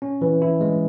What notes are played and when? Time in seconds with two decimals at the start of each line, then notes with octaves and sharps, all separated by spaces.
0.02 C#4
0.21 E3
0.42 E4
0.61 G#3